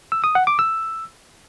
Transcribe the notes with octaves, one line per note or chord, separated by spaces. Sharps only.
E6
D#6
F#5
D6
E6